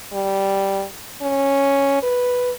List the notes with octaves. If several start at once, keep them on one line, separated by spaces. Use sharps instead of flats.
G3
C#4
B4